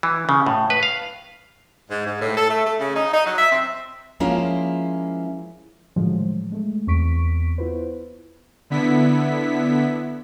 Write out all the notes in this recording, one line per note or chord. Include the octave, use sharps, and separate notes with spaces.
E3
C#3
A2
B4
F5
G#2
G#2
A2
A4
A3
A3
C#3
D#4
D#4
F#3
E5
C4
F3 G#3 A#3 C#4 E4 F4
A2 D3 D#3 F3 F#3 G#3
G#3 A3
E2 C4 C#6 B6 D7
B3 E4 F4 B4 C5
D3 B3 E4 B6